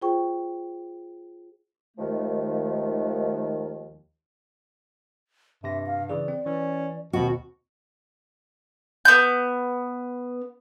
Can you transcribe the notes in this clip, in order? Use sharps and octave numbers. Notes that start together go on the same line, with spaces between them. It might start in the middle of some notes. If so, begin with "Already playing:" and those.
F4 G#4 C5 G5 C#6
D#2 D#3 F3 G#3 A3
G2 C3 E5 A#6
F5
C#3 E3 G#4 D5
C4
E3 C#4
D#2 B2 C4 F#4
B3 G6